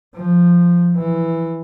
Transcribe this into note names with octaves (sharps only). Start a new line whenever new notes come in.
F3
E3